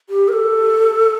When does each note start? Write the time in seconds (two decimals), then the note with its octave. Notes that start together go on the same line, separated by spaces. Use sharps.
0.10 G4
0.28 A#4
0.33 A4